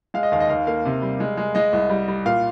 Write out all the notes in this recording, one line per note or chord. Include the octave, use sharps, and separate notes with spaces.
G#3 F5
D#5
D#2 F5
D#5
D#2 F5
A#3 F5
C3
G3
G#3
G#3
G#3 D#5
C2
G3
G3
A#2 F5